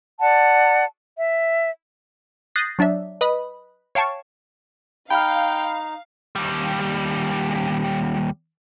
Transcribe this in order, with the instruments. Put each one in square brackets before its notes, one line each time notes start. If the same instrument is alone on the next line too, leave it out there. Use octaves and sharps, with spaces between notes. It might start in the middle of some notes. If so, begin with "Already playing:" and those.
[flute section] D5 F#5 A5
E5
[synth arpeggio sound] D#6 F#6 G6 A6 A#6 C7
F#3 D4 D5 E5
B4 D#5 B5 D#6
C#5 F5 G5 A5 C#6
[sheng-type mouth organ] D#4 [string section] F5 [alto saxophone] G5 [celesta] B5 F6
[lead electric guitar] D#2 G3